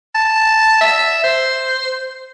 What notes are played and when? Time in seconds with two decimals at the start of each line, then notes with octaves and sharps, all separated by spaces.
0.15 A5
0.81 E5
1.24 C5